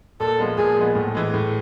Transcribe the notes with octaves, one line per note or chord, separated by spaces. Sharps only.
A#2 A4
F3 G#3 B3
A#2 G#4
F3 G#3 B3
A2
E3 G#3
A2